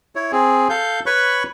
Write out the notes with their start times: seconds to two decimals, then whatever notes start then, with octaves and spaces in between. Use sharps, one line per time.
0.16 E4 C#5
0.32 C4 G#4
0.69 A4 F5 G6
1.06 B4 C#5 B5 C#6 F#6